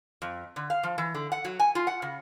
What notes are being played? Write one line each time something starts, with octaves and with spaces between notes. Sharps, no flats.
F2
D3
F5
F3
E3
D3
F#5
F#3
G#5
F4
F#5
C#3